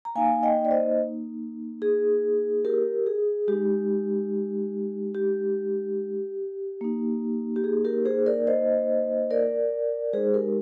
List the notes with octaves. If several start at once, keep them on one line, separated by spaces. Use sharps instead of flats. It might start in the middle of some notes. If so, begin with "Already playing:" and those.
A#5
A#3 D#4 F5 G#5
D#5 G5
D5
C5 D#5
G#4
G4 A#4
G#4
G#3 D#4 G4
G4
A#3 D#4
G4
G#4
G4 A#4
G#4 C5
A#4 D5
C5 D#5
A#4 D5
G#3 D#4 G#4 C5
G4 A#4